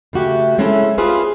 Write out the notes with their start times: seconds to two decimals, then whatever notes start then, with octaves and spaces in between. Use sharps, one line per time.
0.13 C#3 A3 F#4 G4
0.58 G#3 C4 C#4 E4 A4
0.98 F4 G4 G#4 B4 C5 F5